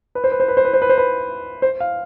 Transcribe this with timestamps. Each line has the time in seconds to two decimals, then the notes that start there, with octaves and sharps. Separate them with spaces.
0.15 B4
0.24 C5
0.32 B4
0.40 C5
0.48 B4
0.57 C5
0.65 B4
0.74 C5
0.82 B4
0.90 C5
0.98 B4
1.62 C5
1.80 F5